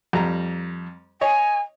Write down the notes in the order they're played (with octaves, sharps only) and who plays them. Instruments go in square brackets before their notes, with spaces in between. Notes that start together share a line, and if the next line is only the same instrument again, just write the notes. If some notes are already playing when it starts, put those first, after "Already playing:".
[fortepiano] F2 G3 A#5
[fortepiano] C#5 D#5 [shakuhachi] G#5